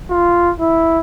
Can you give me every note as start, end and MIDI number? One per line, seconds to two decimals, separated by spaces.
0.10 0.51 65
0.60 1.00 64